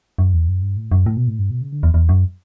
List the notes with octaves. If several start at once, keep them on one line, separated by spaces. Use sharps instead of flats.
F#2
E2
F#2
G2
A2
F#2
A2
B2
A2
G2
B2
C#3
D3
E2
E2
F#2